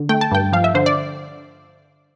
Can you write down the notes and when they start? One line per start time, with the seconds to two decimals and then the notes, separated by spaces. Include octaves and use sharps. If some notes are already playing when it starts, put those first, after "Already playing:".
Already playing: D3
0.09 A3 G5
0.21 A5
0.31 G2 G5
0.53 F3 F5
0.64 E5
0.74 D3 C5
0.86 D5